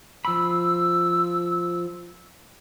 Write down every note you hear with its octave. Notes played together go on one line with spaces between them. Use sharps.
F3 B5 E6